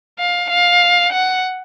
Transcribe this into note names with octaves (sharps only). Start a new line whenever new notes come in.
F5
F5
F#5